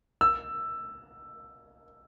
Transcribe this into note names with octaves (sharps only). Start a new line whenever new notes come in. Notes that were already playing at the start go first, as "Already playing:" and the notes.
E6